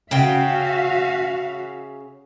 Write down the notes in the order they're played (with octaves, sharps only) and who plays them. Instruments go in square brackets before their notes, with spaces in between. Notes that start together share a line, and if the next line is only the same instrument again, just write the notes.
[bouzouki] C#3 G5 [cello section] F#4 E5 F5